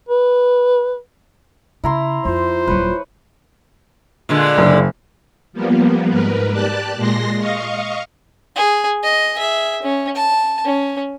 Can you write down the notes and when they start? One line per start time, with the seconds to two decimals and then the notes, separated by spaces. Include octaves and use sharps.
0.09 B4
1.84 C#3 E4 A#5 C6
2.25 F2 F4 C5
2.67 D#1 F#3 B4 C#5
4.29 A#2 D3 G#3
4.58 F#1
5.53 F3 G3 A#3 B3
6.10 G#2 A#4 B4
6.52 G4 D5 A5 F#6
6.96 A#2 G#3 C6 A#6
7.39 D#5 F5 C#6
8.55 G#4
9.03 D#5
9.36 G#4 E5
9.83 C#4
10.15 A5
10.65 C#4